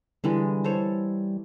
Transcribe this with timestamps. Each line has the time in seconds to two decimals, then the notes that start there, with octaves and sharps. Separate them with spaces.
0.24 D3 E3 G3 G#3
0.64 A4 C5 C#5